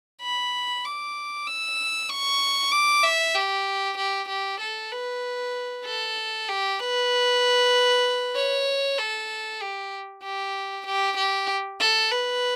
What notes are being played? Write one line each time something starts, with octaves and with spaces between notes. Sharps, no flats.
B5
D6
E6
C#6
D6
E5
G4
G4
G4
A4
B4
A4
G4
B4
C#5
A4
G4
G4
G4
G4
A4
B4